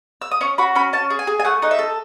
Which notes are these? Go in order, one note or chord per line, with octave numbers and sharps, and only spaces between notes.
E6
D#6
C#4 C#6
F#4 B5
C#4 B5
C#4 A5
G#4
G#5
G#4
G#5
A3 F#5
D#4 F#5
E5
A4